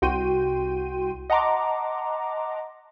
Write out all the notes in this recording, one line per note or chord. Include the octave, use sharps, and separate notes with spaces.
C2 F#4 G5 C6 D#7
D#5 F#5 A5 A#5 C6 D6